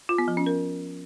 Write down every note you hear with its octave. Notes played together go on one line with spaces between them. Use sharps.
F4
B3
F3
C#4
A#4